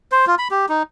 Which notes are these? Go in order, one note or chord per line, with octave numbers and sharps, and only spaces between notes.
C5
F4
B5
G4
D#4